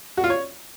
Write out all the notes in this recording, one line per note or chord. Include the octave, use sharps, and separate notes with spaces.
F#4
F4
C#5